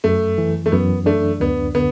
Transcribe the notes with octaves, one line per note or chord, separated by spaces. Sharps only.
F#2 A3
E3
A3
F#2 B3
A3 D4
D2 B3
D3 B3